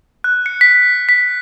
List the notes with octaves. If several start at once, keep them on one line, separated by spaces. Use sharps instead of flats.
F#6
C#7
B6
B6